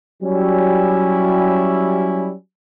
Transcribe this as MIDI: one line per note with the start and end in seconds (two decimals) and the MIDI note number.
0.23 2.31 54
0.23 2.31 55
0.23 2.31 61
0.23 2.31 64